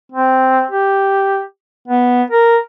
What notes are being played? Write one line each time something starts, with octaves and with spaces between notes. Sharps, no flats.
C4
G4
B3
A#4